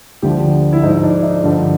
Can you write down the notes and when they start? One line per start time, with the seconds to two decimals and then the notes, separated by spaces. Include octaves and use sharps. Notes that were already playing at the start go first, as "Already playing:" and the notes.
0.22 D2 D3 F3 G4
0.73 E4
0.83 G#2 F3 D#4
1.03 D4
1.23 D#4
1.44 G2 D3 F3